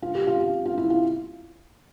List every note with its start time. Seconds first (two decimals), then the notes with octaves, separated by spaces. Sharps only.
0.02 F4
0.15 G4
0.27 F4
0.40 F4
0.65 F4
0.78 E4
0.90 F4